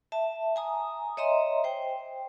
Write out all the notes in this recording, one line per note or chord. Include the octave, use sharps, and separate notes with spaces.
E5 A5
G#5 A#5 D#6
C#5 D#5 E5 A#5 C6
C5 G5